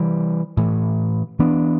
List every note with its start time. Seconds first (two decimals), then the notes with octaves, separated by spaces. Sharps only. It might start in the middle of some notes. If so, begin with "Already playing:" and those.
Already playing: C3 E3 G3
0.57 A2 E3 A3
1.39 E3 B3 D4